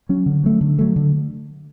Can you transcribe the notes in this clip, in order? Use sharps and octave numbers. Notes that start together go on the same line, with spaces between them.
F#3 C#4
D3
F#3 A3
D3
F#3 A3
D3